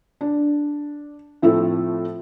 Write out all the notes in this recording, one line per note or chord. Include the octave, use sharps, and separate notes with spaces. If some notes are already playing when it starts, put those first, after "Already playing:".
D4
A2 F3 A3 C4 E4 A4